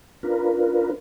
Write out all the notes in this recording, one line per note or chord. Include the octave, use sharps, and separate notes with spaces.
D4 F4 A#4 B4